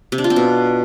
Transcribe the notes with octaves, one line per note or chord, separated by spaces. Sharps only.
C3
D4
F4
C4
B2